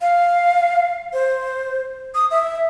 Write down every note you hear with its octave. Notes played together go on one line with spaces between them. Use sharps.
F5
C5
D#6
E5